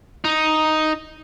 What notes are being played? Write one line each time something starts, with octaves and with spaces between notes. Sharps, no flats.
D#4